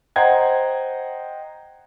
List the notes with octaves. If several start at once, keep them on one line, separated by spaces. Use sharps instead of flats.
C5 D#5 F#5 G5 A#5 G#6